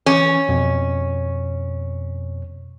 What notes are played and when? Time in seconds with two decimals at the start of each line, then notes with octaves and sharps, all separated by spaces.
0.06 E3 C#4
0.49 F2 B2